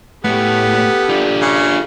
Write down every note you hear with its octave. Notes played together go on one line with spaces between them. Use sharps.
A2 B3 G4 A4
D4 F4
C#3